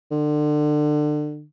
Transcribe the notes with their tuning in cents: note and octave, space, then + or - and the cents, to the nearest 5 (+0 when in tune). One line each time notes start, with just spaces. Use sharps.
D3 +30